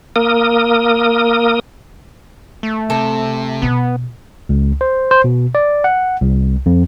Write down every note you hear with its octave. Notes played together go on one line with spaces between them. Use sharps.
A#3 A#4 D#6
A3
C3 A4
B2 B3
C#2
C5
C5
B2
D5
F#5
C2
F2